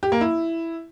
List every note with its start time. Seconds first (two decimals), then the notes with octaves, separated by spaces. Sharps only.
0.03 G4
0.12 A#3
0.21 E4